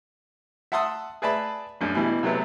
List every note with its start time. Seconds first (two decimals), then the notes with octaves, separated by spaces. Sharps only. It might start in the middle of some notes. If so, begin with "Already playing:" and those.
0.72 E5 F#5 A5 C6 D#6 E6
1.22 G#4 B4 D5 E5 A5 B5
1.81 A#1 F#2 D4
1.95 B2 E3 G3
2.23 C3 F#3 G#3 A3 B3